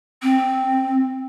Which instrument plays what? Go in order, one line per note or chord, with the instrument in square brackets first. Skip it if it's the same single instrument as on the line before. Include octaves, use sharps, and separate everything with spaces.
[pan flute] C4